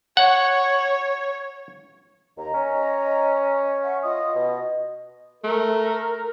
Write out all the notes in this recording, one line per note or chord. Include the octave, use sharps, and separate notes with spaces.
C#5 F#5
D#2 D#5 A#5
C#4
E5 F#5 C#6
F4 D#5 D#6
B2 D#5
A3 A#4